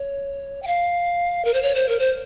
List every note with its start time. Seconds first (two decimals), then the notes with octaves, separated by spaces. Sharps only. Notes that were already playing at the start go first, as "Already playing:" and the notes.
Already playing: C#5
0.63 G5
0.67 F5
1.45 A#4
1.54 C5
1.62 C#5
1.75 C5
1.89 A#4
1.99 C5